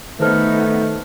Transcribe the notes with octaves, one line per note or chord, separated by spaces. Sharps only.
D#3 A3 B3 D#4 A4 B4 C5 F6